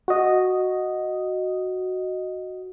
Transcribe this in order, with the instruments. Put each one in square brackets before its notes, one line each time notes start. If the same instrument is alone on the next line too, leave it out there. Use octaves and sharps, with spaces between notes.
[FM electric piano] F#4 D#5